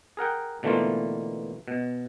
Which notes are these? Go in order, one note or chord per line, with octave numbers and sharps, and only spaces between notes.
G#4 A#4 F#5 G5
B2 D3 E3 A3 A#3 F4
B2